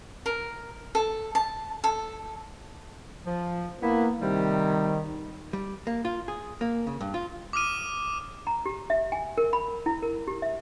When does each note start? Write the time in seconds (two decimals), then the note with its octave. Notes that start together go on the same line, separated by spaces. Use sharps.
0.26 A#4
0.95 A4
1.35 A5
1.84 A4
3.25 F3
3.82 A#3 B3 E4
4.21 C3 D#3 G3
5.53 G3
5.87 A#3
6.05 F4
6.28 G#4
6.61 A#3
6.87 C#3
7.01 G2
7.14 F4
7.53 D6 D#6 F6 D#7
8.47 A#5
8.66 G4
8.90 E5
9.12 G#5
9.38 A#4
9.53 B5
9.86 E4
10.02 A#4
10.28 G4
10.42 E5